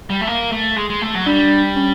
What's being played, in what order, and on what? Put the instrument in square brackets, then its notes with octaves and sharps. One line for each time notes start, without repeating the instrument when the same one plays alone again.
[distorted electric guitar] G3
A3
A#3
A3
G#3
G#3
A3
F#3
[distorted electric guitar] G3 [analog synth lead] D4
[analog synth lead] C#4